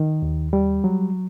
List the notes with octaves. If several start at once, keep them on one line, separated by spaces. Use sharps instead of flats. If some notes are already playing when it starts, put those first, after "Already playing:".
Already playing: D#3
D#2
G3
F#3